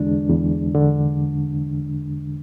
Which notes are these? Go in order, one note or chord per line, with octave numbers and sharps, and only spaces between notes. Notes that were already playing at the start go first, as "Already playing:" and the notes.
Already playing: E2 D3 G#3 D4
E2
D3